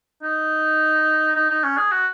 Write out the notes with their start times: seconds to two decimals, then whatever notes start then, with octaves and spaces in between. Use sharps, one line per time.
0.23 D#4
1.36 D#4
1.50 D#4
1.64 C#4
1.77 G#4
1.92 F#4